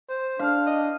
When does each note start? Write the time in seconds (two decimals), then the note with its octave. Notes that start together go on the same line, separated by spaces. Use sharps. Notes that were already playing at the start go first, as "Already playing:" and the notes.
0.09 C5
0.39 D4 F5
0.66 D#5